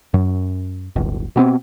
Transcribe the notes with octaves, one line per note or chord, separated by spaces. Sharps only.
F#2
D1 G1
B2 B3 C4